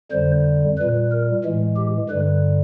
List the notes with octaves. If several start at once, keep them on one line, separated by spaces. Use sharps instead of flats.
F2 D3 G3 C5
A#2 G3 B4
A#4
A2 E3 G#3
G4
G2 D3 G3 B4